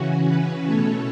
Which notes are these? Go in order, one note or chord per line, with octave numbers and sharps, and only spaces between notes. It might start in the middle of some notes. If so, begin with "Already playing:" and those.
Already playing: C#3 E3 C#4 F#4
F#4 B4
B2 A3 C#4 A4 C#5